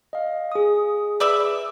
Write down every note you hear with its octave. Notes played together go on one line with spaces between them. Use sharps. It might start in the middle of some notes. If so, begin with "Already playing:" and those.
D#5 F5
G#4 D#6
B4 D5 E5